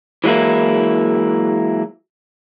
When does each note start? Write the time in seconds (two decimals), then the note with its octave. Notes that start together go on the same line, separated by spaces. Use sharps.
0.24 E3 F#3 G#3 A#3 E4